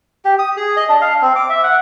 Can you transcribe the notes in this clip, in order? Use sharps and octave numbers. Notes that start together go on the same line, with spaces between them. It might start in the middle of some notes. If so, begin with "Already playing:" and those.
G4
D#6
G#4
D#5
D4
F5
C4
D6
E5
F#5